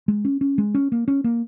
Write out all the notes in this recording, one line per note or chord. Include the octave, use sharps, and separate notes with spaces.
G#3
C#4
C#4
G#3
C#4
A#3
C#4
A#3